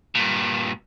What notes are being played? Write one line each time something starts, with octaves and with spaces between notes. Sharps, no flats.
G2 A#2